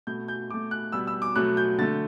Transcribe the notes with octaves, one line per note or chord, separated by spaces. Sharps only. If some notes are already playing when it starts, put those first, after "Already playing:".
B2 A3 G6
G6
B2 A3 D6
F#6
B2 G3 B3 E6
E6
D6
B2 F#3 A3 F#6
G6
D3 A3 A6